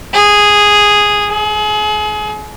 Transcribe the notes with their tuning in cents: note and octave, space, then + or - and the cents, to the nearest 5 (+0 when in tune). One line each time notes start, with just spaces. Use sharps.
G#4 -5
G#4 +35